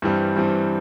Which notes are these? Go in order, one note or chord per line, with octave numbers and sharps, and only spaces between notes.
G2 E3 G3 C4
G2 E3 G3 C4